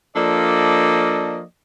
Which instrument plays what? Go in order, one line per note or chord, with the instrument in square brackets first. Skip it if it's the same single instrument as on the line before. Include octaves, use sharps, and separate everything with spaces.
[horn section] F3 A#3 D4 A4 D5 D#5